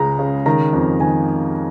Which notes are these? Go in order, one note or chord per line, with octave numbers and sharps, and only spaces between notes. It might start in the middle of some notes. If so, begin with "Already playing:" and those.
Already playing: C#2 C#3 G#3 A#5
C#3
D#3 A#5
F2
D#3 G#5